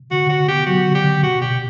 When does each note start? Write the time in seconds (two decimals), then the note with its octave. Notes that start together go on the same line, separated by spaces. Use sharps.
0.11 D3 F#4
0.29 D3 F#4
0.48 B3 G4
0.66 F#3 F#4
0.85 D3
0.95 G4
1.04 D3
1.22 B2 F#4
1.41 B2 G4